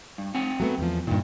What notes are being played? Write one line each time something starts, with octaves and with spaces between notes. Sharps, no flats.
G2
C4 F#5 G#5
F#3 A3 B3
E2 F3
G2 A#2 D#3